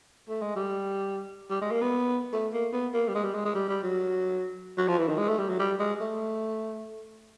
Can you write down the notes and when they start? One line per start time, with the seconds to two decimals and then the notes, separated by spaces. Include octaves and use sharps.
0.29 A3
0.42 G#3
0.56 G3
1.50 G3
1.62 G#3
1.71 A#3
1.82 B3
2.33 A3
2.53 A#3
2.73 B3
2.94 A#3
3.08 G3
3.15 G#3
3.24 G3
3.34 G#3
3.45 G#3
3.55 G3
3.69 G3
3.83 F#3
4.78 F#3
4.88 F3
4.98 E3
5.09 D#3
5.18 G#3
5.29 A3
5.39 G3
5.49 F#3
5.59 G3
5.79 G#3
6.01 A3